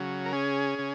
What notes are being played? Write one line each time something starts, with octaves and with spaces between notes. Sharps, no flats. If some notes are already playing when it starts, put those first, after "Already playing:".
Already playing: C#3 F#3
A#4
C#4 G#4
C#3